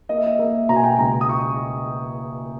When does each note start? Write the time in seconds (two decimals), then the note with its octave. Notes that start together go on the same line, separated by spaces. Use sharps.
0.09 A#3 D#5
0.18 E5
0.27 D#5
0.39 A#3 E5
0.69 B2 A#5
0.76 G#5
0.84 G5
0.90 G#5
0.99 C#2 A#5
1.21 D#6
1.29 C#6